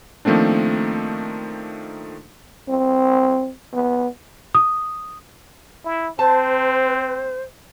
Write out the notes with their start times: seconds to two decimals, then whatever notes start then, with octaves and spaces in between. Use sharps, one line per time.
0.25 D#3 F3 A3 A#3 C4 D4
2.69 C4
3.73 B3
4.55 D#6
5.85 E4
6.19 C4 C5 A5